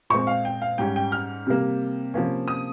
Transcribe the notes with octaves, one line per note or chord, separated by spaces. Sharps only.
A#2 G#3 C4 C#6
F5
G5
F5
G#2 G3 C#4 G5
G5
F6
C3 G3 A#3
C3 F3 A#3 C#4
D#6